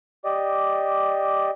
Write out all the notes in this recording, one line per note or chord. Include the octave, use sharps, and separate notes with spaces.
G4 D5 D#5